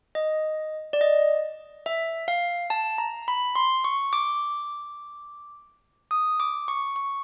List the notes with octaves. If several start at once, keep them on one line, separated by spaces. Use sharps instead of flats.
D#5
D5
D#5
E5
F5
A5
A#5
B5
C6
C#6
D6
D#6
D6
C#6
C#6